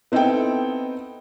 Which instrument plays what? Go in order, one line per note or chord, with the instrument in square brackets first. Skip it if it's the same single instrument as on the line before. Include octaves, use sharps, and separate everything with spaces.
[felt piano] B3 C4 D#4 E4 A4 G5